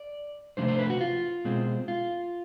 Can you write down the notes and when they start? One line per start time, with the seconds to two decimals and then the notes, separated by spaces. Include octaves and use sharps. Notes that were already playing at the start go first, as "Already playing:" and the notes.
Already playing: D5
0.57 C3 F3 A3 D4 C5
0.68 C5
0.79 B4
0.90 F#4
1.01 F4
1.45 B2 G#3 C4
1.88 F4